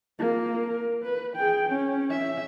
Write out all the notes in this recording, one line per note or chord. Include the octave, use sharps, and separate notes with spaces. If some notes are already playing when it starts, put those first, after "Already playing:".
A#3 F4
A#4
B4
G#4 G5
C#4
E5